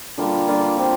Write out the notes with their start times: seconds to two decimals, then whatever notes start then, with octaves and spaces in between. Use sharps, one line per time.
0.18 D3 G3 A#3 F4
0.47 D3 G3 A#3 F4
0.77 F3 C4 G4